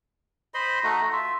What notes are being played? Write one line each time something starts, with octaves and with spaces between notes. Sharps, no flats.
C5 D#5 B5 C6
A3 D#4 F#4 D#5
F4 E5